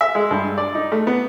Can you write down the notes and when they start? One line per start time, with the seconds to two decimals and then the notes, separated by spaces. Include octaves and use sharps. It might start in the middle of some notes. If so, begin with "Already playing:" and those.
0.01 E5
0.15 G#3
0.31 G2
0.58 D5
0.75 D#4
0.92 A3
1.07 B3